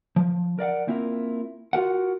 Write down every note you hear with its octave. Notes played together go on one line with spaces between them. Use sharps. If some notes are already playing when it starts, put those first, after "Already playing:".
F3
A#4 D5 F5 F#5
A#3 C4 E4 F4 A4 A#4
F4 F#4 A#4 F#5